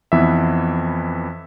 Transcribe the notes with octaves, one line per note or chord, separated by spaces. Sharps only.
F2 E3 B3 E5